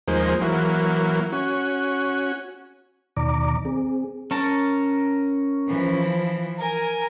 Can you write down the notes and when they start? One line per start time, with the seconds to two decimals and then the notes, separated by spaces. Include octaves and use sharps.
0.08 D#2 F3 G#3 A#3 C5
0.41 E3 F#3 A#3
1.32 C#4 F#4
3.17 D#2 B2 D#3 D5 A#5 D6
3.65 C4 G#4
4.31 C#4 A#4 A5
5.69 E3 F3
6.59 A#4 G#5